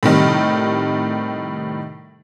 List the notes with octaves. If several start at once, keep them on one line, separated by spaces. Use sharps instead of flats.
A2 C3 D#3 G3